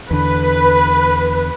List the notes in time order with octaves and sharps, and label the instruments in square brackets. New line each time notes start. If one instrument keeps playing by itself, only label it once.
[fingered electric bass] E2 D3 [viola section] B4